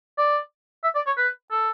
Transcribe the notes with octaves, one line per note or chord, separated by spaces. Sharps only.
D5
E5
D5
C#5
B4
A4